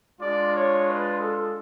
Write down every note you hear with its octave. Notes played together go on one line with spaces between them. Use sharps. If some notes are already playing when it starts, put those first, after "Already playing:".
G#3 D4 F4 D5
C#5
B4
A4